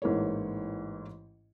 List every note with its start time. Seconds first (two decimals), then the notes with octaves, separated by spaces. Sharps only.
0.02 A1 G#2 E3 A#3 C#5